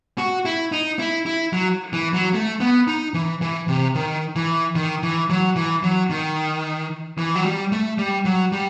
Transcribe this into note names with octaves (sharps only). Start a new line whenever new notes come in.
F#4
E4
D#4
E4
E4
F#3
E3
F#3
A3
B3
D#4
E3
E3
C3
D#3
E3
D#3
E3
F#3
E3
F#3
D#3
E3
F#3
G3
A3
G3
F#3
G3